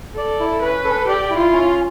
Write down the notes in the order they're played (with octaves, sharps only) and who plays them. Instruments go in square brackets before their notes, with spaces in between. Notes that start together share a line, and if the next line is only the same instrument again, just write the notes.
[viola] A4 [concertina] D5
[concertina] E4
[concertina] C#4 [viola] B4
[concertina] A4
[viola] G4 [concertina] D5
[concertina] E4
[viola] F4
[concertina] C#4